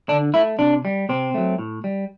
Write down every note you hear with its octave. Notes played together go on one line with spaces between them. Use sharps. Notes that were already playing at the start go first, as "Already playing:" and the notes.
D3 D4
A3 E4
C3 D4
G3
C3 C4
F#3 A3
A2
G3